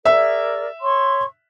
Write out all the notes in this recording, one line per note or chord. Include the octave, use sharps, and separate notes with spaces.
G#4 A#4 D5 E5 E6
C#5 C6 C#6